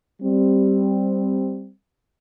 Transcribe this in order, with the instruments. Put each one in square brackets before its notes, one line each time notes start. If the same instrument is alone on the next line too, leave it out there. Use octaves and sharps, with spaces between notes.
[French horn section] G3 C4